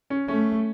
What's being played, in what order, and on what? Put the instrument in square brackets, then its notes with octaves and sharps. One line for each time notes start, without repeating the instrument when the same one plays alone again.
[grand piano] C#4
[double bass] A3 [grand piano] C#4